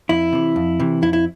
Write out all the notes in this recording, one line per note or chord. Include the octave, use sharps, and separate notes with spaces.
F2 E4
C3 E3
F2
C3 E3
F2 E4
E4